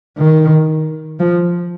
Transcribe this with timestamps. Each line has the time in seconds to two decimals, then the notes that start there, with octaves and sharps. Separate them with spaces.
0.18 D#3
1.20 F3